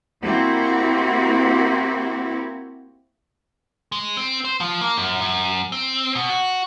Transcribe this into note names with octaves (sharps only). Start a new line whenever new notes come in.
A#3 C4 E4 F#4 G4
G#3
C4
C5
F3
A#3
F#2
F#2
C4
B2
F#4